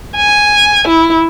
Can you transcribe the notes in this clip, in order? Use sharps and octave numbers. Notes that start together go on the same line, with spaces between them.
G#5
E4